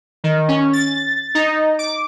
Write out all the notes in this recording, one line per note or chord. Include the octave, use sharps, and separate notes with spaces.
D#3
C#4
A6
D#4
D6